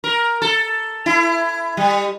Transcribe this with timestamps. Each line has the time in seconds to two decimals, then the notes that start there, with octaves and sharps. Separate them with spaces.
0.04 A#4
0.42 A4
1.06 E4
1.77 G3